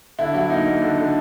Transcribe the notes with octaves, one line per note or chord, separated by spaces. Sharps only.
D3 E4
F#3 E4
A#3 D#4
A#3
D3
D3